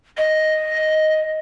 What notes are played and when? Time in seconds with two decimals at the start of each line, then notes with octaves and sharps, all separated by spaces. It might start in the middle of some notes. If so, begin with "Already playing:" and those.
0.18 D#5